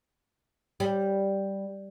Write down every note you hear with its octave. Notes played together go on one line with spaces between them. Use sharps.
G3